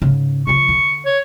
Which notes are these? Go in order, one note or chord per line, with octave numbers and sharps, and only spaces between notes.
G#2 C#3
C#3 F3 C#6
D3
C#5